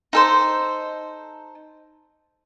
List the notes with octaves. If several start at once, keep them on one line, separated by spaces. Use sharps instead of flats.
D#4 A4 C5